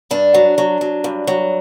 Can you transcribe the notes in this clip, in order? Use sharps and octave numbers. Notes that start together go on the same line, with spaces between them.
G2 D4
F#3
F#3
F#3
G2
F#3